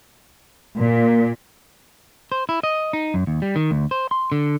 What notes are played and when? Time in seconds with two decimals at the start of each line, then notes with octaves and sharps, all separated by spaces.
0.79 A#2 A#3
2.32 C5
2.49 E4
2.63 D#5
2.93 D#4
3.14 F#2
3.27 D#2
3.42 G3
3.56 D#3
3.71 D2
3.91 C5
4.11 C6
4.32 D3